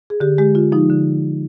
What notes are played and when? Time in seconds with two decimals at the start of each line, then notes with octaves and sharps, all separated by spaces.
0.10 G#4
0.20 D3 G4
0.38 G#3 G4
0.55 D3 F4
0.72 F3 D#4
0.90 D3